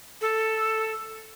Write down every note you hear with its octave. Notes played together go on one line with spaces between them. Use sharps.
A4